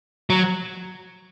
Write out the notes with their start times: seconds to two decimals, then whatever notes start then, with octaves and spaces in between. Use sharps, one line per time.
0.30 F#3